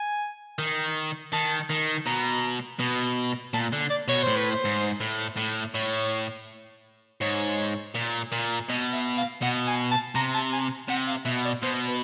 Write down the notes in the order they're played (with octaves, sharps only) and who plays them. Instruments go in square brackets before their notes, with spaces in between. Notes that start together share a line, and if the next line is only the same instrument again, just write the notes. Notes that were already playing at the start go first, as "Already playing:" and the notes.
Already playing: [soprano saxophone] G#5
[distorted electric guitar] D#3
[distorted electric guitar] D#3 [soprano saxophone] A5
[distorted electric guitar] D#3
[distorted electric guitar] B2 [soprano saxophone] A#5
[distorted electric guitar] B2
[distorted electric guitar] A#2 [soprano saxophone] A5
[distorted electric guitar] D3
[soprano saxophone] D5
[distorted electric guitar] B2 [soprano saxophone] C#5
[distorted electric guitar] A2 [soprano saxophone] C5
[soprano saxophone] B4
C5
[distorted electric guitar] G#2
A2
A2
[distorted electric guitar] A2 [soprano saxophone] C#5
[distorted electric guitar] G#2 [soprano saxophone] C#5
[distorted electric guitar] A#2
A#2
[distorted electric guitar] B2 [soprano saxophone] D#5
[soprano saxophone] E5
F5
[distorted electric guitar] B2 [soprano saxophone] F#5
[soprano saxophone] G#5
A5
[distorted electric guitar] C3 [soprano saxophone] A#5
[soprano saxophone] A5
G#5
[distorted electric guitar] C3 [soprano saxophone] F#5
[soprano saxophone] F5
[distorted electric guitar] B2 [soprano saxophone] E5
[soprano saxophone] D5
[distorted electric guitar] B2 [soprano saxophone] C5
[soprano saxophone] B4